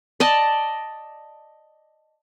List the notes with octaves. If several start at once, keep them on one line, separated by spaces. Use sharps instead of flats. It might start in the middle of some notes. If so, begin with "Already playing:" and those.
D5 D#5 A5